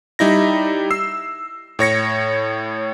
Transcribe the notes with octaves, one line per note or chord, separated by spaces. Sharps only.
G3 D#4 E4 A#6
E6 C7
A2 C#5 A#6 C#7